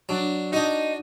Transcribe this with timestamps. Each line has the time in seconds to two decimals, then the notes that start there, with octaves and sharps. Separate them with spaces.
0.09 F#3 D4
0.52 D4 D#4 F#4